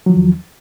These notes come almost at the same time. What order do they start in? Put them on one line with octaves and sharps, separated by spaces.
F#3 F3 D#3 E2